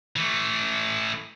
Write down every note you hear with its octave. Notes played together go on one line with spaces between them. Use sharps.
E3 A3